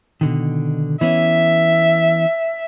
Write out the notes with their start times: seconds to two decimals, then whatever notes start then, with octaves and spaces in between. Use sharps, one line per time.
0.21 B2 D3 D#3
1.01 E3 B3 C#4 E5